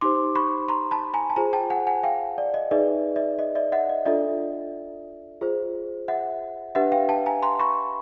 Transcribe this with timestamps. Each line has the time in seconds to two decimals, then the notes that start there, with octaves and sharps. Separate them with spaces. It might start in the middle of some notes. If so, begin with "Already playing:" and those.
0.01 D#4 G4 C5 C6 D6
0.35 B5 C#6
0.68 A#5 C6
0.91 A5 B5
1.14 G#5 A#5
1.30 A5
1.36 F4 G#4 C5 G#5 A#5
1.53 G5 A5
1.70 F#5 G#5
1.87 F#5 G#5
2.03 F5 G5
2.38 D5
2.54 D#5
2.71 D#4 G#4 B4 D5 E5
3.16 D5 E5
3.39 D#5
3.55 D5 E5
3.72 E5 F#5
3.89 D#5
4.05 D4 F4 A4 D5 E5
5.41 F4 G#4 C5
6.08 E5 F#5
6.75 D4 G4 B4 E5 F#5
6.92 F5 G5
7.09 G5 A5
7.26 G#5 A#5
7.43 A#5 C6
7.59 B5 C#6